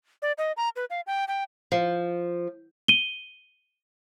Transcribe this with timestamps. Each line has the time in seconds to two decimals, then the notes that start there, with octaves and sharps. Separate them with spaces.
0.22 D5
0.38 D#5
0.57 A#5
0.76 B4
0.90 F5
1.07 G5
1.28 G5
1.72 F3
2.88 D#7 G7